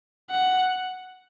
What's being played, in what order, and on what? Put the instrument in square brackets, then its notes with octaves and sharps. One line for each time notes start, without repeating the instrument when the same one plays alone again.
[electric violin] F#5